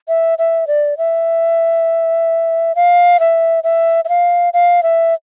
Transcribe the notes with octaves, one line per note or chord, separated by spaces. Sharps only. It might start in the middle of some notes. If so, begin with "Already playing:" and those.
E5
E5
D5
E5
F5
E5
E5
E5
F5
F5
E5